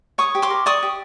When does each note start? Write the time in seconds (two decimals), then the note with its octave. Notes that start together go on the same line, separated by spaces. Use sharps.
0.18 C#5 C#6 D#6
0.35 G4
0.42 C6 D6
0.50 A#4
0.66 D5 C#6 D#6
0.83 G4